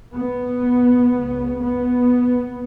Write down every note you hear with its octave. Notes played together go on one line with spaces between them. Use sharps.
B3
C#2 C#3
B3